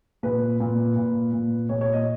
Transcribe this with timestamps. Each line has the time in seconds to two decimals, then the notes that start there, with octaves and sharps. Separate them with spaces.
0.23 A#2 B4
0.60 A#2
0.96 A#2
1.32 A#2
1.69 A#2 C#5
1.81 C#5
1.93 D#5